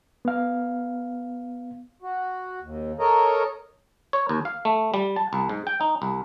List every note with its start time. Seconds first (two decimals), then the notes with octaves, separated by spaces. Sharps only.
0.25 B3 F5
2.02 F#4
2.61 D#2
2.99 A4 A#4 C#5 D#5 A#5
4.13 C#5
4.29 D#2
4.45 F5
4.65 A3
4.94 G3
5.16 A5
5.33 C2
5.49 G#2
5.67 G5
5.81 D#4
6.02 C2